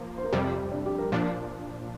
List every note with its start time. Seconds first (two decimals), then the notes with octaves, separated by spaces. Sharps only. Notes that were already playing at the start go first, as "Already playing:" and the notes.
Already playing: F3 A#3
0.18 C5
0.24 A#4
0.33 F2 C3 G3 G4
0.72 D4
0.86 G4
0.98 A#4
1.11 A#2 F3 D4 A#4